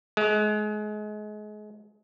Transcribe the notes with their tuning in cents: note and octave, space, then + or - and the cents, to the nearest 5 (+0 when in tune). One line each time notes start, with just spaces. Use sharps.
G#3 +30